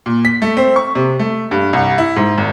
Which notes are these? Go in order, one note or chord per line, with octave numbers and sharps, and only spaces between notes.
A#2
B6
A3
C4
C#6
C3
A3
G2
C2
E4
G#2
G#1